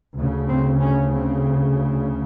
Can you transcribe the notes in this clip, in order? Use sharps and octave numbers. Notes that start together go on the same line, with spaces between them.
D2 C#3
C4
C#4
C4